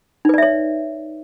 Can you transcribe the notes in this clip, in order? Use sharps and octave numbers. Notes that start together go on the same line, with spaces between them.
D#4 B4 C#5 D5 E5